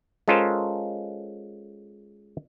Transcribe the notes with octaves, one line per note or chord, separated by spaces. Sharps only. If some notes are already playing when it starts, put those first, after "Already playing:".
G#3 C#4 F4 A4 A#4 C5